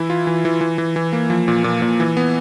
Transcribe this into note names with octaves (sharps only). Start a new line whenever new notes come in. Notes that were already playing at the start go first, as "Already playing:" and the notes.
Already playing: E3 E4
F4
E3
E3
E3
E3
E3
A#3
F3
A#2
A#2
A#2
E3
B3